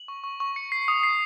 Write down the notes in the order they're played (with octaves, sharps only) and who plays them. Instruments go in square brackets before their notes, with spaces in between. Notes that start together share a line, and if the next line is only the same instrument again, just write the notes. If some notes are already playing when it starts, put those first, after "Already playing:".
Already playing: [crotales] F#7
C#6
C#6
C#6
C#7
C7
D#6
C7